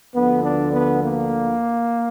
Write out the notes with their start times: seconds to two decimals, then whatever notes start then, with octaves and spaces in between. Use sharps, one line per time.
0.14 D2 D3 F3 B3
0.44 D4
0.73 B3
1.02 A#3